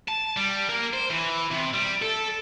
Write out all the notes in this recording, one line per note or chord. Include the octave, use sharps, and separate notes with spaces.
A5
G3
A#3
C5
E3
C3
G3
A4